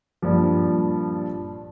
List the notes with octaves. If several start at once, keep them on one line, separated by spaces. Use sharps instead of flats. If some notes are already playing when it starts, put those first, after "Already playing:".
G2 A#2 F3